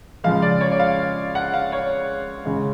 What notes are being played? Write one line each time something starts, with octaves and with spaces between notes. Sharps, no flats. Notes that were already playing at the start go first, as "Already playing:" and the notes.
C#3 F3 G#3 F5
D5
C#5
D5
F5
F#5
F5
C#5
C#3 G#3